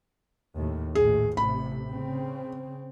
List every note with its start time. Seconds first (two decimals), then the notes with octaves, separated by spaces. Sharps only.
0.57 D#2 A2
0.95 A#1 D#2 A2 G#4
1.37 A1 A2 C3 B5
1.90 C#3 C4